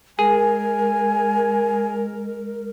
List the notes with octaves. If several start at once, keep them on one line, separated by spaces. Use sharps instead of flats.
G#3 G#4 A#4 G#5